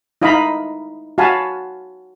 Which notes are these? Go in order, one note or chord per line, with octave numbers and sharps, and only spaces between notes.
D#4 E4 D#5 F5 A#5 B5
F#4 F5 G#5 A5 B5